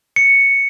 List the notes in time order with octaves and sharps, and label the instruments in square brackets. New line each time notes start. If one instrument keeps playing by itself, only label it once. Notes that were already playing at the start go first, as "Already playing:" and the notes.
[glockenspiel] C#7